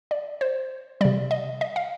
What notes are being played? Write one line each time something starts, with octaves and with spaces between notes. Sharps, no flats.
D5
C5
C3 G3 D5
D#5
D#5
F5